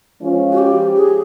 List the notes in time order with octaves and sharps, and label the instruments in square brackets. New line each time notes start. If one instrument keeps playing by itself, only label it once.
[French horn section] F3 G#3 C#4 F4
[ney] F#4
G4
G#4